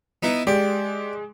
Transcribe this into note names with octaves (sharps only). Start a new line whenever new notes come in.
B3 D#4 E4
G#3 G4 D5